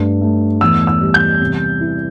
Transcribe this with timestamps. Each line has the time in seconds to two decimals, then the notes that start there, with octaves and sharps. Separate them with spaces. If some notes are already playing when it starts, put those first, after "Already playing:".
Already playing: G2 A3
0.21 A3
0.61 E2 E6
0.87 E6
1.01 G3
1.14 G6
1.41 C3
1.81 E4